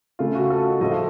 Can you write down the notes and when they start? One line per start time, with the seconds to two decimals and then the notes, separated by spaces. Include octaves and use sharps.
0.19 C#3 A3 F4
0.35 F#4
0.50 A4
0.66 D#5
0.80 A2 F3 A3 D#5
0.91 F5